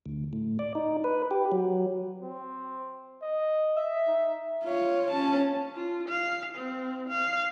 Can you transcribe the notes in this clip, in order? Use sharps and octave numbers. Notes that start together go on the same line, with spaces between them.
D2
A2
D5
D#4
B4
G4
F#3
C4
D#5
E5
D#4
F4 C#5
C#4 A5
F4
F5
C4
F5